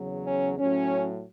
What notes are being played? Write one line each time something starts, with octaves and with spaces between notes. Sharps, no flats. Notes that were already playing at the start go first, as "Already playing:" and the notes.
Already playing: E2 C#3 F#3
C#4
A2 F#3 C#4